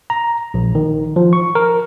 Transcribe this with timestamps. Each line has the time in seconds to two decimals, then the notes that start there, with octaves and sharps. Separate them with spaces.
0.10 A#5
0.54 A#1
0.75 D#3
1.16 F3
1.33 C#6
1.55 A#4